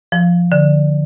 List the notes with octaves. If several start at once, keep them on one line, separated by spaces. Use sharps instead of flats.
F3
D3